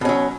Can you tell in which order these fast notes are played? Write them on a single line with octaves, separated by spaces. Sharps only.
B2 C#4 F#3